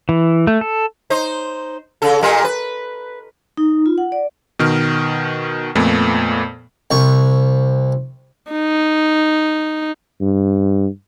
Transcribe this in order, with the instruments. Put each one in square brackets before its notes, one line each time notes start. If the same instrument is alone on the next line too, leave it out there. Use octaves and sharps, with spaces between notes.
[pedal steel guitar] E3
A3
A4
[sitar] D#4 C5
C#3 A4
A#2 G3 A#4
B4
[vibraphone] D#4
F4
F#5
D5
[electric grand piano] B2 D#3 F6
F2 A#2 A3 B3
[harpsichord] C2 C#6
[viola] D#4
[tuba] G2